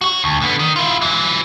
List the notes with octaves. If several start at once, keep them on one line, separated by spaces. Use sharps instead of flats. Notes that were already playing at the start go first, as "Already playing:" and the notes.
F#4 C#5
D2
D3 B3
D#3
E4 F4
E3 F#3